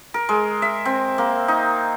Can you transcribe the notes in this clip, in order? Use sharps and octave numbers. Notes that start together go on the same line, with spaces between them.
A#4
G#3
E5
C4
A#3
D#4